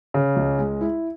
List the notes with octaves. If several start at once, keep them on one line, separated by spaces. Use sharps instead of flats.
C#3
C#2
G#3
E4